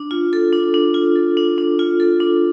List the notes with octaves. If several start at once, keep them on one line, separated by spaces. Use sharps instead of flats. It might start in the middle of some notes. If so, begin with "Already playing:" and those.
Already playing: D4
F4
A4
D4
D4
F4
A4
D4
D4
F4
A4
D4